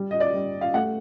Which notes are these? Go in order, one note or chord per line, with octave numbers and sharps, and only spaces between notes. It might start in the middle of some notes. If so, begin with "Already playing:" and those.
Already playing: G3
D#5
D5
G3
F5
A3 F#5